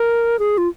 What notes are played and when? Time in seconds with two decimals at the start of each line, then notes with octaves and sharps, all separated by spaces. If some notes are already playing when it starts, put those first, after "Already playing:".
Already playing: A#4
0.39 G#4
0.58 F4